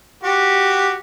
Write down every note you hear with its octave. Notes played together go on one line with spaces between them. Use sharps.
F#4 G4